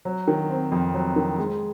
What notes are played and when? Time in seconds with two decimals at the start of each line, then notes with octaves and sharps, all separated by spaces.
0.05 F#3
0.28 D#3
0.50 C4
0.72 F2
0.94 F#3
1.16 D#3
1.38 G#3